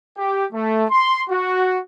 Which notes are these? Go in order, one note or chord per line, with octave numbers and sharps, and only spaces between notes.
G4
A3
C6
F#4